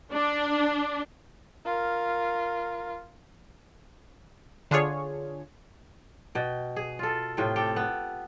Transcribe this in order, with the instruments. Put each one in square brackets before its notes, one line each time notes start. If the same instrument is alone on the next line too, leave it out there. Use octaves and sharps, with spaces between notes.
[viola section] D4
[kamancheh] F4 A#4
[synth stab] D3 D4 F4 G#4 C#5
[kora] B2 G5
G#4
F4 A4
A2 C3 F4 G5
G4 A4 G5
B3